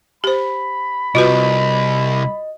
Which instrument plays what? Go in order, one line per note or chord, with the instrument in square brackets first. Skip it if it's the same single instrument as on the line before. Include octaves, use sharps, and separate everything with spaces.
[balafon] G4 C5 [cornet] B5
[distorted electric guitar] C2 [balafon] F4 F#4 B4 [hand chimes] D#5